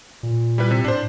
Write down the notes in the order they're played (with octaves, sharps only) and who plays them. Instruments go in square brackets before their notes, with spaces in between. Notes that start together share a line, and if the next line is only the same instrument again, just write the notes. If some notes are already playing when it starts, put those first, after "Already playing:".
[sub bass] A#2
[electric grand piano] G3 E4 B4
C3
[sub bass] A2 [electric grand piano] D4 C5